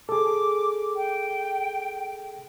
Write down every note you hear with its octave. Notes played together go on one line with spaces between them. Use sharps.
G#4 A4 D6
G5